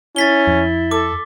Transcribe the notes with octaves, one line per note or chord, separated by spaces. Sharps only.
C#4 E4 A6 B6 G7
F2
A4 D6